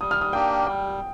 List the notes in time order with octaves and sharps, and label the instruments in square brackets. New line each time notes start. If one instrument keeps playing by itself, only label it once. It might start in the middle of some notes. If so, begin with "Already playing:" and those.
[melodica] G3 [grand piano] D#6
[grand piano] F6
D#6
[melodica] A#3 D4 G4 [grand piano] G5
[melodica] G3 [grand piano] G5